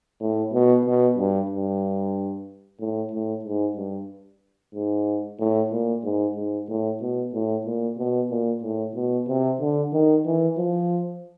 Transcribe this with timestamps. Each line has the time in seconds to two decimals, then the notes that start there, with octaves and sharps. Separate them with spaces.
0.20 A2
0.53 B2
0.85 B2
1.17 G2
1.50 G2
2.80 A2
3.12 A2
3.44 G#2
3.77 G2
4.74 G#2
5.39 A2
5.71 A#2
6.03 G#2
6.36 G#2
6.69 A2
7.01 B2
7.33 A2
7.65 A#2
7.98 B2
8.31 A#2
8.63 A2
8.95 B2
9.28 C3
9.60 D3
9.93 D#3
10.25 E3
10.57 F3